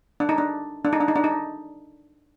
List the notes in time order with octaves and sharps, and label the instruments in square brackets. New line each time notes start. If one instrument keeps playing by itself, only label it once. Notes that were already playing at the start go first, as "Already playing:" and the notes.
[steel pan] D4
D#4
D4
D4
D#4
D4
D#4
D4
D#4